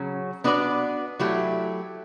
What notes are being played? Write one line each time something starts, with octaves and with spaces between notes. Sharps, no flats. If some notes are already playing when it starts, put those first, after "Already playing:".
Already playing: C#3 F#3 C#4 F#4
B3 D4 F#4 B4 D5
F#3 A3 E4 G4